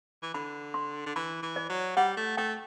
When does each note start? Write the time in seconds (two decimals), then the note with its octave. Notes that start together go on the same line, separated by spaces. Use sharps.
0.22 E3
0.34 D3 B5
0.74 C6
1.06 D3
1.16 E3 B5
1.42 E3
1.56 D5
1.70 F#3
1.97 G3 F#5
2.17 A3
2.37 A3 G5